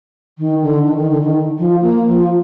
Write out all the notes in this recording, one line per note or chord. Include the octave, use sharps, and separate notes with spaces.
D#3
D3
D#3
D#3
D3
D#3
F3
A#3
F3